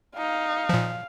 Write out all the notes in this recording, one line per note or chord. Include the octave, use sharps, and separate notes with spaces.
D#4 F5
A#2 F3